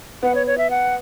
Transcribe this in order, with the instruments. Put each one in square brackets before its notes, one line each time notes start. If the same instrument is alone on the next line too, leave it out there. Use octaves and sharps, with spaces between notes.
[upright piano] B3 [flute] F#5
[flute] C#5
C#5
E5
F#5